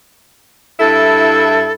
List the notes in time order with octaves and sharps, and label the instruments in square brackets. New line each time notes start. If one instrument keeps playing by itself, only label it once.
[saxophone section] G2 E4 [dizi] A4